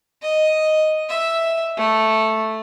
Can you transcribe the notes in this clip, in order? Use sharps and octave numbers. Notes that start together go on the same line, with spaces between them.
D#5
E5
A3